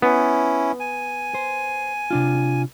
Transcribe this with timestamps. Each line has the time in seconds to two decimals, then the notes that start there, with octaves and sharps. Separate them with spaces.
0.02 B3 C#4 E4
0.80 G#5
1.34 C5
2.11 C3 D4 F4